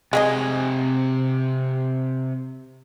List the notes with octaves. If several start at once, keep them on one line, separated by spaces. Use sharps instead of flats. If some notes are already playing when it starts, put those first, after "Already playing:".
C3 G#3 G#4 D#5 G#5